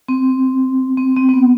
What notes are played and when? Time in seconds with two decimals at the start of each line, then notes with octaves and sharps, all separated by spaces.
0.08 C4
0.97 C4
1.16 C4
1.29 C4
1.34 B3